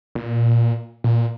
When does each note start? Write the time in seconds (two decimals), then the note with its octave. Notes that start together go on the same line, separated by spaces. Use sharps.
0.15 A#2
1.04 A#2